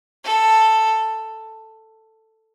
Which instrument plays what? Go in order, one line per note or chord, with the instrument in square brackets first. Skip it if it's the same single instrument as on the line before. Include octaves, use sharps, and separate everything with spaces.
[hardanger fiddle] A4